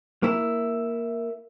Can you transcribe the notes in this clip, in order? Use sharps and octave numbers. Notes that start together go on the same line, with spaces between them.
A#3 E4